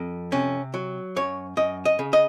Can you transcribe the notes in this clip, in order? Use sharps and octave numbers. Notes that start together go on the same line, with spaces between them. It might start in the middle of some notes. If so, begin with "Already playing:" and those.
Already playing: F2
C3 C#4
F#3
F#2 C#5
F#2 D#5
D#5
C#3
D#5